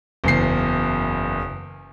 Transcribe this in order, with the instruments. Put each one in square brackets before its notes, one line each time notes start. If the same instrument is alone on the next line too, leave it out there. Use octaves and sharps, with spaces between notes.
[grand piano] F#1 E2 C7